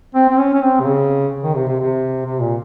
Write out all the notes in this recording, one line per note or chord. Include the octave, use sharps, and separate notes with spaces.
C4
C4
C#4
C#4
C4
C3
C#3
D#3
C3
C3
C3
C3
A#2